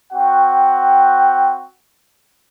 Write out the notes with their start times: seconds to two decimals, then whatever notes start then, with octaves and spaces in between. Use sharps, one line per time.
0.13 C4 F#4 F#5 G5